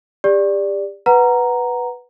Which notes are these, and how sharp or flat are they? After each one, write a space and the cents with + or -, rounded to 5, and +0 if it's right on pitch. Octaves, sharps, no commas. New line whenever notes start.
G4 +35 D5 +0
B4 +0 F#5 +0 A#5 +0